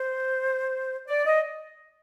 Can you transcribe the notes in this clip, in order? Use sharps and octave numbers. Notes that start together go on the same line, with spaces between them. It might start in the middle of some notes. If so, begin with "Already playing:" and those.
Already playing: C5
D5
D#5